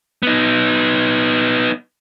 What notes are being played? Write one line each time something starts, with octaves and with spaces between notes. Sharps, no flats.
B3 D#4